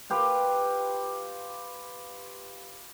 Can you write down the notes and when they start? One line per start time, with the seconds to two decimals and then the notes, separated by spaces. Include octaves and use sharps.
0.10 F4 G4 B4